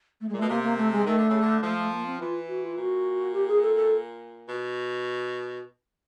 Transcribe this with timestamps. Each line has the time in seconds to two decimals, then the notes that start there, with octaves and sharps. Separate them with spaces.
0.21 A3
0.29 G#3
0.33 A#2
0.37 B2 A3
0.49 C3 A#3
0.63 A#3
0.78 A3
0.92 G#3
1.06 D#3 A3
1.18 D3
1.30 C#3
1.41 D3
1.63 F3 A3
1.77 A3
1.91 A#3
2.06 C4
2.20 E3 F4
2.48 F#4
2.63 F4
2.77 A#2 F#4
3.33 G4
3.48 G#4
3.62 A4
3.76 A4
4.48 B2